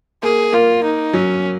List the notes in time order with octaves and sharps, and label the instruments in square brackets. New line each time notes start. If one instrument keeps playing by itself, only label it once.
[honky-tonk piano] A#3 [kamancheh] G#4
[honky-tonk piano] A#3 [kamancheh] F4
[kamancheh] D#4
[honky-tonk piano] F#3 [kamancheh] C#4